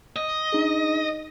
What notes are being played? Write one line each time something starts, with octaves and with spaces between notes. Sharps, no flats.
D#5
D4 D#4 G#4